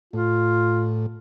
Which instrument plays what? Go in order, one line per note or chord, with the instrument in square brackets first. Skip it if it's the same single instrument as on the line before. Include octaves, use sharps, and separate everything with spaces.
[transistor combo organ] A2 [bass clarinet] F4